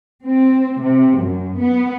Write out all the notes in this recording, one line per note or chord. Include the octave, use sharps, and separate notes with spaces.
C4
C3
F#2
B3